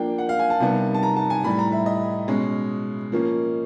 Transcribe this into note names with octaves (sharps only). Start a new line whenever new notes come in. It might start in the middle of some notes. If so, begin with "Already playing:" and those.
Already playing: F3 A#3 D4 G5
F#5
F5
G#5
A5
C3 D#3 G3 B3
A5
A#5
A5
G#5
A2 E3 G3 B5
A#5
E5
D#5
B2 G#3 C#4
F3 A#3 C#4